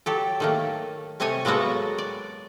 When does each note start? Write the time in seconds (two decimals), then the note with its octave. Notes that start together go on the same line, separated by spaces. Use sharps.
0.06 F#3 G4 A4
0.40 D#3 A3 A#3
1.20 C3 A3 C#5 D#5 G#5
1.45 F#3 G#3 A#3 B3 F#4 A4
1.98 D5